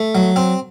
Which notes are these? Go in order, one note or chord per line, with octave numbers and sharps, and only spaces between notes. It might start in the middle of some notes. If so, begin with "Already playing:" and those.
Already playing: A3
F#3
C4